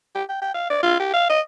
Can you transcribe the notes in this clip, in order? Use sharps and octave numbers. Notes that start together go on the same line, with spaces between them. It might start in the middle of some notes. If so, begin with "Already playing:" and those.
G4
G5
G5
F5
D5
F4
G4
F5
D#5